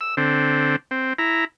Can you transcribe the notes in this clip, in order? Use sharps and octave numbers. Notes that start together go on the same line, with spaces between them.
E6
D3 C4
C4
E4 A#5